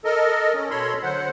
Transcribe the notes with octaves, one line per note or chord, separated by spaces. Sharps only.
A4 A#4 D#5
C#4
B2 A4 C#5 B5 C6
D3 F#3 C5 F#5